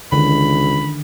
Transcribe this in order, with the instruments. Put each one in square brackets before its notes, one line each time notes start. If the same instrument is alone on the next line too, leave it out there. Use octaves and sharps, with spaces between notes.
[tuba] C#2 [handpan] D3 D#3 [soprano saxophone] B5